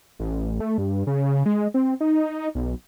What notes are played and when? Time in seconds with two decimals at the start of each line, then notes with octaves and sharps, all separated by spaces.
0.19 A1
0.60 A3
0.78 G2
1.07 C#3
1.46 G#3
1.74 C4
2.00 D#4
2.55 B1